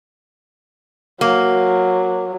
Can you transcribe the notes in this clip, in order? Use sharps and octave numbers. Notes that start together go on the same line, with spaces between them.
F#3 A#3